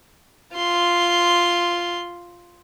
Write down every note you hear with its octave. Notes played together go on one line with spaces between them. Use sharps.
F4 C6